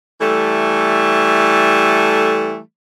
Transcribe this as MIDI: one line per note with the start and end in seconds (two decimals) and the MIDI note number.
0.20 2.59 52
0.20 2.59 55
0.20 2.59 57